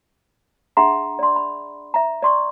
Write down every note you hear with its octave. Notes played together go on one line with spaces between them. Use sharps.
D4 G#4 E5 F#5 A#5 C6
D5 C6
B5
E5 A#5
D5 C6 C#6